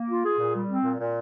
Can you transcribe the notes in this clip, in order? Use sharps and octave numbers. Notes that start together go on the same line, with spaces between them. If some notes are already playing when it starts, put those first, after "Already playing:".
Already playing: A#3
F4
G#4
A#2
G3
C4
A#2
A#2